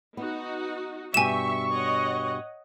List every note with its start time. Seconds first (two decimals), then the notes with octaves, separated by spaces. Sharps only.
0.17 B3 D#4 F#4
1.14 G2 B2 G4 E5 G#5 C#6 E7
1.72 C#5 D#5 F#5